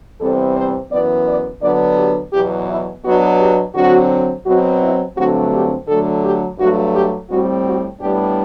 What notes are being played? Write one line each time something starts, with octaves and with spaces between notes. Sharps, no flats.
E2 C3 G3 C4 A4
C5
F#2 E3 B3 D5
D5
D3 F#3 B3 D4 D5
G4
E2 B2 F#3 G4
E4
B2 F#3 B3 D4 F#4
G4
D3 F#3 C4 F#4
B2 F#3 C4 F#4
E4
G2 D3 F#3 A3 C4 F#4
G4
D3 F#3 A3 A4
G4
G2 F#3 A3 F#4
G4
A2 G3 C4 F#4
F#4
A2 G3 B3 D4 G4